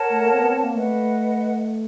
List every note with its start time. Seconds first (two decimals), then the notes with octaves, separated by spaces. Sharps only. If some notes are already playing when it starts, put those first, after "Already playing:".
Already playing: A#4 C#5 F#5 A5
0.10 A3
0.26 A#3
0.33 C4
0.39 B3
0.51 C4
0.63 A#3
0.75 A3 B4 D#5 F#5